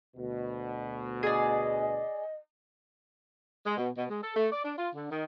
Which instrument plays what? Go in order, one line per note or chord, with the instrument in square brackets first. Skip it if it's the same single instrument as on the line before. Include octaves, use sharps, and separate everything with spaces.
[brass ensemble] D2 B2
[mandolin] G#4 D5 [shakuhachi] D#5
[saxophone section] G#3
B2
B2
G#3
A4
A3
D5
D4
F4
D3
D#3